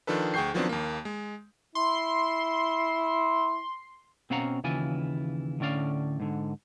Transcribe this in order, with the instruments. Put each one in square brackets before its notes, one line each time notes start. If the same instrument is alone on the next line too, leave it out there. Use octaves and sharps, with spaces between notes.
[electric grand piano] D#3 F3 D4 A4 B4
D2 G#4 G5 C#6 G6 C7
D#3 F3 F#3 B3 C4 D4
D#2 A#3
G#3
[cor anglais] E4 [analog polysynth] C6
[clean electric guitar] B2 C4 C#4 F5 F#5 A#5
D#2 C#3 E3 E4 F4 G#5
A2 D3 C#4 D5 F5
G#2 D3